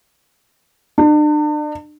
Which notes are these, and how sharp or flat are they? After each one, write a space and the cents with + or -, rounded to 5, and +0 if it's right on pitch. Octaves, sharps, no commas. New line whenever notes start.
D4 +40